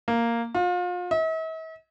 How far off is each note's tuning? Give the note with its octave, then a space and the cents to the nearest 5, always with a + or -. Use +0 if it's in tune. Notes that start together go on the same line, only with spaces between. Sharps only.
A#3 -5
F4 +35
E5 -45